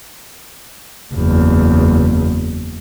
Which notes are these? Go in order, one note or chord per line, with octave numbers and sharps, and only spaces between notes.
F#1 E2